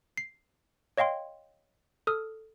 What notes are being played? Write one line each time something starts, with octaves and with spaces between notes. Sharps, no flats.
C7
C#5 D#5 F5 G5 C6
A4 D#6 F6